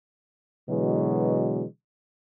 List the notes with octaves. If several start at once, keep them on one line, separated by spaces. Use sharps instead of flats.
B2 D3 E3 F#3 G#3